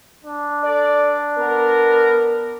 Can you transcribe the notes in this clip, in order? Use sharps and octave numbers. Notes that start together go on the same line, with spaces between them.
D4
A4 D5
B3 A#4